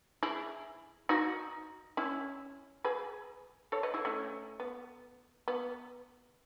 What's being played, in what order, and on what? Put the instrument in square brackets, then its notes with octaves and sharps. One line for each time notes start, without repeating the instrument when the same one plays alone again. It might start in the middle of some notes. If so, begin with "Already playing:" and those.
[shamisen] E4 G#4
D#4 F#4
C#4 E4
G#4 B4
A4 C#5
B4 D#5
E4 G#4
A3 C#4
B3
B3